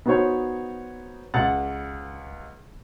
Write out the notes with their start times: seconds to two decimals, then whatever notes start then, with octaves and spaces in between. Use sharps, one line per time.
0.06 B3 D#4 F#4 C5 C#5
1.34 C#2 F#5 A6 F#7